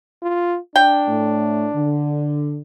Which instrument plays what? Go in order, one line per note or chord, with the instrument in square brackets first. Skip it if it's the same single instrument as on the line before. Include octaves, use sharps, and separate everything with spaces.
[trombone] F4
[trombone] D4 [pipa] G5
[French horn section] A2 A3
D3